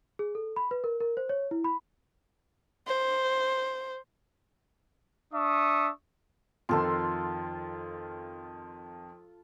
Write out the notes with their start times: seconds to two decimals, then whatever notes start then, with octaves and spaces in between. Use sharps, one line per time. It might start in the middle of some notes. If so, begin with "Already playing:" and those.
0.19 G#4
0.35 A4
0.56 B5
0.71 B4
0.84 A#4
1.00 A#4
1.17 C5
1.29 C#5
1.51 E4
1.64 B5
2.87 C5
5.33 D4 E5 C#6 D#6
6.69 F2 D#3 F4 A4 C6